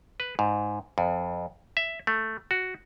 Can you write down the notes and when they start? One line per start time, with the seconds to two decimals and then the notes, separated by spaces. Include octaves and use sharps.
0.20 B4
0.39 G#2
0.98 F2
1.77 E5
2.07 A3
2.51 F#4